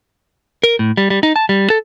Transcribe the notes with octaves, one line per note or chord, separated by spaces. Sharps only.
A#4
A2
G3
G3
D#4
A5
G3
A4